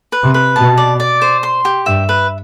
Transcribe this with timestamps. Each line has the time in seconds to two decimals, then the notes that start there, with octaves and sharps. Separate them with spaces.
0.12 B4
0.23 C3
0.34 B4
0.56 B2 A5
0.77 D5
1.00 D5
1.22 C5
1.43 C6
1.65 G4
1.86 G2 E5
2.09 B4